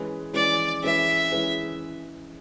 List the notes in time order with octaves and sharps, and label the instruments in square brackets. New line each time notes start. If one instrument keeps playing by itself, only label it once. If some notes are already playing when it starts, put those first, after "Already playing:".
Already playing: [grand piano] E3 G#3 C#4 G#4 B4
[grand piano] E3 G#3 C#4 G#4 B4 [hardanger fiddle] D5
[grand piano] E3 G#3 C#4 G#4 B4 [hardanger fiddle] E5
[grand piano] E3 G#3 C#4 G#4 B4